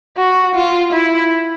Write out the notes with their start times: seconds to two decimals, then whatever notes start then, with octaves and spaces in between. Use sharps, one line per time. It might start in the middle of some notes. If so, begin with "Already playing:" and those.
0.18 F#4
0.55 F4
0.93 E4